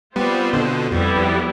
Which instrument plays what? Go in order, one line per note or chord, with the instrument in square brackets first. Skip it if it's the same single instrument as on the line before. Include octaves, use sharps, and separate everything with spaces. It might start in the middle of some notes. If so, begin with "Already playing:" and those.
[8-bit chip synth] G3 B3 [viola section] C4 F4 C5
[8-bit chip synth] B2 D3
[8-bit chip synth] F2 [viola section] G3 B3 E4
[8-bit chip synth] F2